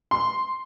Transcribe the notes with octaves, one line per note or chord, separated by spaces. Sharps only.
C6